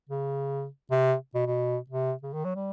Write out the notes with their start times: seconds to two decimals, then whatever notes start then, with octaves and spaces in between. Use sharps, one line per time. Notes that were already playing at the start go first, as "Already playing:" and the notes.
0.09 C#3
0.91 C3
1.35 B2
1.46 B2
1.89 C3
2.23 C#3
2.33 D#3
2.44 F#3
2.55 G3